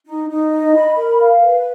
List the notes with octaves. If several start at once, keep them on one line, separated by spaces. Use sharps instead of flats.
D#4
D#4
D#5
B5
A#4
F5
B4